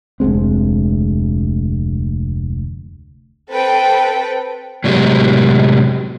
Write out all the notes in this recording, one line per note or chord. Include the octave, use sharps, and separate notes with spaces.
F1 D2 G#3 C4
C4 A4 B4 G5
A2 C3 F#3 G#3 B3 G4